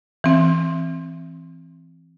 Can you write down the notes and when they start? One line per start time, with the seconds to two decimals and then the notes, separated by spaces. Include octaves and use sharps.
0.24 E3 C4